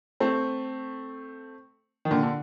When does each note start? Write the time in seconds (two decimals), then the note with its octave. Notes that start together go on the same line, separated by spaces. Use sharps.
0.20 A3 C4
2.05 D#3
2.11 A#2 D3
2.23 D3